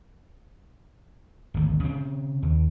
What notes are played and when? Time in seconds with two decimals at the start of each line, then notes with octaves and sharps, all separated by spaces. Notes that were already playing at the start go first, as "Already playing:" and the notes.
1.54 G#1 D2
1.84 C#3 C4
2.42 D#2